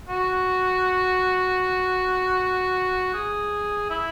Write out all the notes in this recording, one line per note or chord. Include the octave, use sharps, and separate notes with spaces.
F#4
G#4
E4